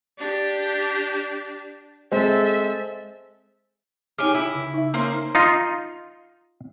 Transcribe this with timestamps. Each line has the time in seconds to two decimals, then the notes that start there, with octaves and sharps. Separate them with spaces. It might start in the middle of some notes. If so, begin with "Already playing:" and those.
0.19 D4 G4
2.12 G#3 C4 A4 E5
4.18 D#4 G4 C#5 G#5 F6
4.34 E4
4.55 C#3
4.74 D#4 E5
4.94 A#3 C#4 C5
5.35 D#4 F4